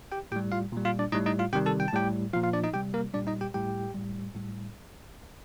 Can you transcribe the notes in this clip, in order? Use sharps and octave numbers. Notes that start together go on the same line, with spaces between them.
G4 G5
A2 G3 G4 G5
F4 F5
A#2 G3
F4 F5
D4 D5
A2 G3 D#4 D#5
D#4 D#5
F4 F5
C3 D#3 G3 G4 G5
A4 A5
G5
A5
A2 G3 G4 G5
A#2 F3 F4 F5
F4 F5
D4 D5
D#4 D#5
C3 G3 G4 G5
A#3 A#4
A#2 G3 D4 D5
D#4 D#5
G4 G5
A2 G3 G4 G5
A2 G3
A2 G3